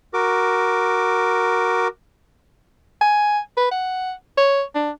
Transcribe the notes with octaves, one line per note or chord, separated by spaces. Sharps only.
F#4 A#4 D6
G#5
B4
F#5
C#5
D4